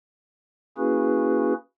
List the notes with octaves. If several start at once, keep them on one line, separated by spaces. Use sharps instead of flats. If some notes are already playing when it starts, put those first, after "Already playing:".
A#3 C#4 E4 F#4 G#4 B4